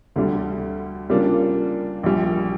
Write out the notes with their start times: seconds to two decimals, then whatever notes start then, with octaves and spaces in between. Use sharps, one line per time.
0.16 D2 D3 G3
1.10 C#3 G3 A#3 D4 F4
2.03 A#1 A#2 G3